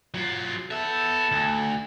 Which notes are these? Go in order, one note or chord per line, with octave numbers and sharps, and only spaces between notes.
F#3 F4
B3 A4 E5
D2